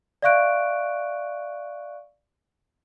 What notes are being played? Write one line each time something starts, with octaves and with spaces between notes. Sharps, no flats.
D5 E5 F5 C#6 F#6 D7